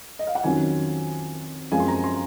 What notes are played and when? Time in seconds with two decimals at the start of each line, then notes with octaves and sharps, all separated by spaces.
0.19 D#5
0.27 F5
0.35 F#5
0.43 F2 D#3 F#3 C#4 G#5
1.72 F#2 F3 G#3 C4 G#5
1.80 C6
1.88 A#5
2.04 C6